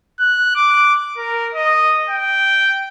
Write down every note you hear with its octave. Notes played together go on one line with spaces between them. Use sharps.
F#6
D6
A#4
D#5
G5